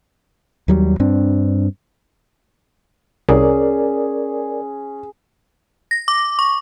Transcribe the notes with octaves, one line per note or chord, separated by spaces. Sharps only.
D#2 F#3 G3
G2 C4 D4
C2 C#4 G#4 A#4 D5
A#6
D6
C#6